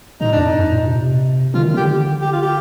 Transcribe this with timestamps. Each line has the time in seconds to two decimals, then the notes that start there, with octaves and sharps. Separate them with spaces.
0.21 A2 D#4
0.32 F2 D4
0.45 D#4
0.54 G2
0.70 A#2
0.87 C3
1.54 D3 F4
1.64 D#3
1.74 D3 G4
2.22 G4
2.32 F4
2.43 G4